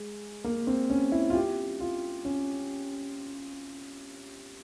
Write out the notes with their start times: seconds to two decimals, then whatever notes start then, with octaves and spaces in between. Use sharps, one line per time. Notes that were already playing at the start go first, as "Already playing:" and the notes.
Already playing: G#3
0.44 A#3
0.67 C4
0.90 C#4
1.12 E4
1.30 F4
1.34 G4
1.80 F4
2.25 C#4